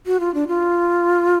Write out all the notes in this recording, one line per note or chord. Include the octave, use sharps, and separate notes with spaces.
F#4
F4
D4
F4